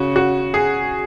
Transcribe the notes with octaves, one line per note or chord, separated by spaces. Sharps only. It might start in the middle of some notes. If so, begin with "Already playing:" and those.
Already playing: C#3 F#4
F#4
G#4